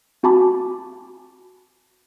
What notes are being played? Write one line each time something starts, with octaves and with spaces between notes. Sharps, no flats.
C4 F#4 G#5 A5 B5 D6